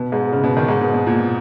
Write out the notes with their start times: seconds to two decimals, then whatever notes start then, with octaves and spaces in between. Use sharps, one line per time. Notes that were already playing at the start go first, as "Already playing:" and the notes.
Already playing: B2
0.12 G#2
0.32 C#3
0.44 B2
0.57 D#3
0.68 G#2
0.81 B2
0.93 B2
1.07 A#2